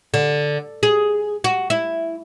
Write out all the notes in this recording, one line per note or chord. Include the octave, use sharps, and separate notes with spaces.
D3
G#4
F#4
E4